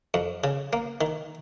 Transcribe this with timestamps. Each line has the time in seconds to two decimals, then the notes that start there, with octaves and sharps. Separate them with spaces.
0.14 F2
0.44 C#3
0.73 A#3
1.01 D#3